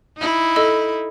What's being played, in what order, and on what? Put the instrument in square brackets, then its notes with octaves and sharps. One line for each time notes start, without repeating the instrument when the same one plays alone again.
[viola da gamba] D#4 E4
[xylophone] A4 D#5 E6